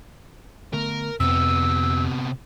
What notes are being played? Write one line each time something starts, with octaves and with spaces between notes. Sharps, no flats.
D3 A3 B3 A#4
F2 C3 B3 E6